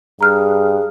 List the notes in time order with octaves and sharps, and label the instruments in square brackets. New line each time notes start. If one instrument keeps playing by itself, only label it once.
[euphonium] G2 [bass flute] G#4 [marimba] A#5 F6 F#6